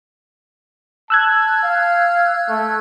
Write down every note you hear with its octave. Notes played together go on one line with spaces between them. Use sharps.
A5 E6 F#6 G#6
F5
A3